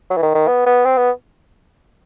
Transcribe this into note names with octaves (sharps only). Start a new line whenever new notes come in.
F#3
E3
D#3
D#3
B3
B3
C4
B3